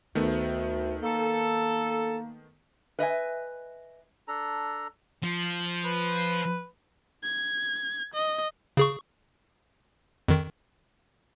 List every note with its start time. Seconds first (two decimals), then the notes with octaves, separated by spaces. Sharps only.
0.15 D2 D#3 A3 B3
1.02 A#3 A4
2.99 B4 D#5 E5 G#5
4.28 D4 A4 A#5
5.24 F3
5.85 B4
7.24 G#6
8.14 D#5
8.77 C#3 G#4 C#6
10.28 F2 D#3